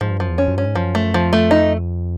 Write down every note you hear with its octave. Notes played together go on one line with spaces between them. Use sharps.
G#2 F3
G2
F#2 F3
E2
F2 C#4
F#2
G2 C#4
G#2
F#2 F3
A3
F2 F3
A3
D#4